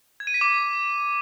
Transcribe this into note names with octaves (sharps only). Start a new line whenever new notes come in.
G#6
D#7
B6
D6